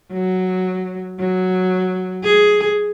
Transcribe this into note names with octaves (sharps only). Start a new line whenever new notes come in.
F#3
F#3
G#4